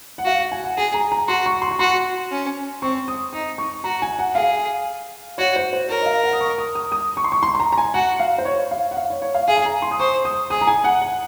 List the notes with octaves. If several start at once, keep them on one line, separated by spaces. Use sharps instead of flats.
F#5
F#4 F5
F#5
G#5
F#5
G#4 G#5
A#5
A#5
F#4 C6
C#6
C6
C#6
F#4 C6
C#4
C4 C#6
D#6
D#4 D#6
C#6
F#4 A#5
G#5
F#5
G#4 F5
F#4 C#5
C5
C5
A#4 C#5
D#5
F5
F#5
D#6
C#6
D#6
D#6
D#6
C#6
C6
C#6
C6
C6
A#5
A#5
G#5
F#4 F#5
F5
C5
C#5
F5
F#5
F5
C#5
C#5
F5
G#4 F5
G#5
A#5
C6
D#6
C5 C#6
D#6
G#4 D#6
A#5
G#5
F#5
F#5